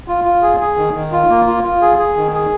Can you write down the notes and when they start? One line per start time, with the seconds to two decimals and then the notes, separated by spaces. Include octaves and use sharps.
0.08 F4
0.24 F4
0.42 G#4
0.60 G#4
0.77 D#3
0.94 D#3
1.12 F4
1.30 A#3
1.47 F4
1.64 F4
1.82 G#4
1.99 G#4
2.17 D#3
2.34 G#4